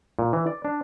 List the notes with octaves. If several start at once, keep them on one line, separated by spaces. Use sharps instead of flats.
A#2
E3
D5
D4